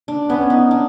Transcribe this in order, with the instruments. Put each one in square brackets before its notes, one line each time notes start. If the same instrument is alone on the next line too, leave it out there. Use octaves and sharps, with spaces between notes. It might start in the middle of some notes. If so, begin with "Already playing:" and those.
[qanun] D4
[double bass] B3 [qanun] C#4
[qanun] D#4
D4